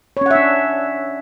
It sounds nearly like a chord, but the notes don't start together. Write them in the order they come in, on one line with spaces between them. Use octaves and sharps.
C#5 C#4 F#5 E5 D4